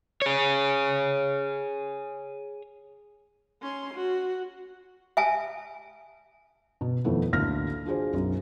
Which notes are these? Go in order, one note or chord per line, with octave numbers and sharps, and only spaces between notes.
G#4 C#5
C#4 C6
F#4
E5 G#5 A5
B2
F2 D#3 A3 B3 E4
A1 D2 A#3 F6 A#6
D4 F4 F#4 G#4 C5
B1 F#2